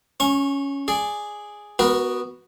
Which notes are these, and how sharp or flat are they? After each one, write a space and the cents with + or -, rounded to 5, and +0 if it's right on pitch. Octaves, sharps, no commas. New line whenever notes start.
C#4 +5 C#6 -25
G#4 +0 D5 -5
B3 +0 F#4 +0 A#4 +30